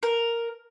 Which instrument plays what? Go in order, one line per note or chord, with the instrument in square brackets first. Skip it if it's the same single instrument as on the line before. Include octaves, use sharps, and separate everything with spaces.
[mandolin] A#4